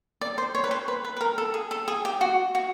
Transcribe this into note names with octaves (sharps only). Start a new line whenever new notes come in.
D5
C5
C#5
B4
C5
B4
B4
B4
A#4
A4
G#4
A4
G#4
G4
F#4
F#4